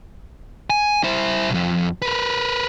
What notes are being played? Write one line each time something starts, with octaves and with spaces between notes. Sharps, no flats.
G#5
E4 C5
B1 F2
A#4 B4